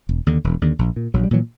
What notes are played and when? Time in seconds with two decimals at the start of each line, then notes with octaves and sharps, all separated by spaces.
0.09 E1
0.26 D#2 D3
0.44 E1
0.61 D#2 D3
0.79 A#1
0.96 A#2
1.14 A#1 F#3
1.24 G3
1.31 A#2 E3 F#3